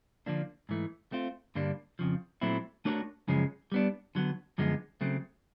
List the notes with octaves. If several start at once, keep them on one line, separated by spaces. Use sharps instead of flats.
D3 F3 A#3 D4
G#2 E3 A3
A3 C4 F4
G2 D3 G3 A#3 D4
F2 C#3 F3
A#2 F#3 A3 C4 E4
A3 D4 F#4 A#4 C#5
F#2 C#3 F3 G#3 C#4
G3 B3 D4
D3 F#3 B3
F#2 D3 F3 G#3 B3
C#3 F#3 A3 C4